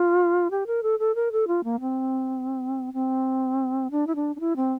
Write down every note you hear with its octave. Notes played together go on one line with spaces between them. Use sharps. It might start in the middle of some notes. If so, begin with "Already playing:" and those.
Already playing: F4
G4
A#4
A4
A4
A#4
A4
F4
A#3
C4
C4
D4
E4
D4
D4
E4
C4